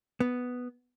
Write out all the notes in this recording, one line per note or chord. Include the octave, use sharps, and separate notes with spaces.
B3